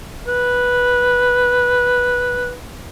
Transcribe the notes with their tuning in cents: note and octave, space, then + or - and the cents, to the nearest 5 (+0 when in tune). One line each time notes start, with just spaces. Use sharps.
B4 -5